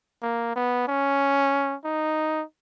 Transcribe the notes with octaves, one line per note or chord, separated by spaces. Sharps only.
A#3
B3
C#4
D#4